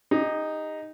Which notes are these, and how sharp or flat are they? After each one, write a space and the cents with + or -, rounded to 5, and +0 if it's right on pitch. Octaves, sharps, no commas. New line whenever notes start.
D#4 +0 G4 +45